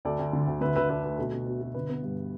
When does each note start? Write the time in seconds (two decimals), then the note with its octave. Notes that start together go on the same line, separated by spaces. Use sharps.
0.05 D2 A4 D5
0.19 D2
0.33 D3
0.47 D2
0.61 D3 B4 E5
0.76 D3 B4 E5
0.89 D4 B4 E5
1.04 A3 B4
1.18 B2 A4
1.32 B2
1.46 B2
1.60 B2
1.74 D3 B4
1.89 B3
2.03 G2